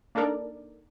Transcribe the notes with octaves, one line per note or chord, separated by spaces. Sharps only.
A#3 D4 D#4 A4 A#4 D5